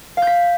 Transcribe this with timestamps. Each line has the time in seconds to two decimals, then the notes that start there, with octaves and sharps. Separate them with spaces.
0.17 F5
0.22 G6
0.27 B6